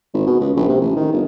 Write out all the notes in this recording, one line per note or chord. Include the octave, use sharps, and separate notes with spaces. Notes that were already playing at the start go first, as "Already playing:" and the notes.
G#1
B2
C#2
A#1
C3
A1
D#3
G1